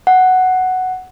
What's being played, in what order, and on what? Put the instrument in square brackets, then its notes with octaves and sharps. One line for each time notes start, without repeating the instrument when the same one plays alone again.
[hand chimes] F#5